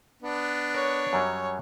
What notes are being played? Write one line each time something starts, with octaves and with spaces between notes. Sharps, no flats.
B3 D4
A#4 C#5
F#2 F#3 G3